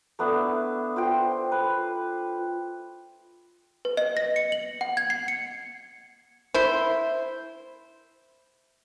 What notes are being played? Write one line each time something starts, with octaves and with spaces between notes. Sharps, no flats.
A3 B3 D4 E4
F4 C5 G5
B4
B4
D#5
A#6
C#7
F#7
F#5
G#6
C7
C#7
E4 C5